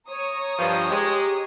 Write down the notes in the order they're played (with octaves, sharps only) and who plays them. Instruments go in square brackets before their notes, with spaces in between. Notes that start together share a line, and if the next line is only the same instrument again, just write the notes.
[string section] C#5 A#5 D#6
[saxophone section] G2 F3
[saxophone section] G#3 [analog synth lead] G4